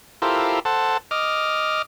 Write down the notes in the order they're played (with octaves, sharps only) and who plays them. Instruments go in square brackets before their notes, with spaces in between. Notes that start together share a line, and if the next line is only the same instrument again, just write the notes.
[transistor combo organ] E4 F4 G4 A4 A#4 C5
A4 C5 F#5 A5
D#5 D6 F6